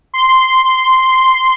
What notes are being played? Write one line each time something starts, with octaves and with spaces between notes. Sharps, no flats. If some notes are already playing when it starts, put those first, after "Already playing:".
C6